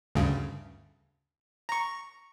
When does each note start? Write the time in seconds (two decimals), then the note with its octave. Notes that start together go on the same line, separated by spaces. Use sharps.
0.15 D2 G2 C#3
1.69 A#5 C#6